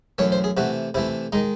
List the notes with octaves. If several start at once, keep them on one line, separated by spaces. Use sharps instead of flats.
F#2 E3 A3 C#5
C5
G#4
C3 E3 A3 F#4
C3 E3 A3 E4
D#3 G#3 D#4